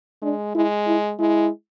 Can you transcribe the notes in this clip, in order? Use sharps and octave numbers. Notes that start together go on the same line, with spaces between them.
G#3 D4
G#3 E4
E4
G#3 E4